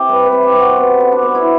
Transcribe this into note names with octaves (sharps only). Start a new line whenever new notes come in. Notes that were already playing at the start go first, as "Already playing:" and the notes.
Already playing: C3 G4
G3 B4
B4
C3
G4
C4
F#4
B3
D3
D4
B3
E4